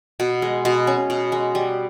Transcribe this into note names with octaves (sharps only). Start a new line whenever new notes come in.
B2
G#3
B2
C#4
B2
G#3
G3